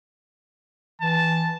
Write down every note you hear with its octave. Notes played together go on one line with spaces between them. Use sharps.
E3 A5